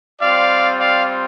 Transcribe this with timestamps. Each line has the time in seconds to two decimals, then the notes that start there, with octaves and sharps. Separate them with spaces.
0.21 G3 C4 F4 D5 F5
0.78 D5 F5